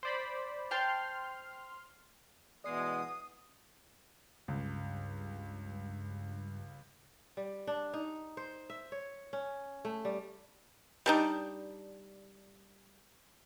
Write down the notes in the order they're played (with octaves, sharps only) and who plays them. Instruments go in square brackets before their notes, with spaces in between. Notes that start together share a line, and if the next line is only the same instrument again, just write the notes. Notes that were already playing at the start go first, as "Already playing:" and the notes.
[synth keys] C5 D5 B5
[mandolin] C5 G5 A5 [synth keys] C6 F6
[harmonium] B2 E3 B3 [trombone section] G#3 [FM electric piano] D5 C7 [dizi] D#6
[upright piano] C#2 [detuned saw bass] G2
[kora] G3
D4
D#4
C5
E5
C#5
C#4
A3
G3
[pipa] G3 D4 D#4